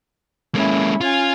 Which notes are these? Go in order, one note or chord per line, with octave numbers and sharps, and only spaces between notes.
G#3 A#3 C#4 E4
C#4 F4 G#5